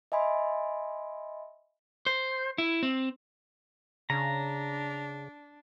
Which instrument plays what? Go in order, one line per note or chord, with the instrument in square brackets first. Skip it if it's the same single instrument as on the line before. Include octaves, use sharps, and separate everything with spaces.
[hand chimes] D#5 E5 G#5 B5 C6
[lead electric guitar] C5
E4
C4
[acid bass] C#3 [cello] D4 [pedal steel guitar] A#5